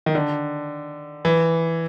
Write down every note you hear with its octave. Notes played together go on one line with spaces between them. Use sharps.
D#3
D3
E3